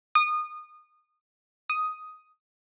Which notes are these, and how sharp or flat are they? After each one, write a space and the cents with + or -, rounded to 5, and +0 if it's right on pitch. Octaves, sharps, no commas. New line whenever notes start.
D#6 -25
D#6 +5